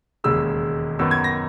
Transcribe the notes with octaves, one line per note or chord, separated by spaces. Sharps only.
E1 D#2 C#3 G#3 E6
F#2 D#3 F#3 B3 E6
G#6
A#6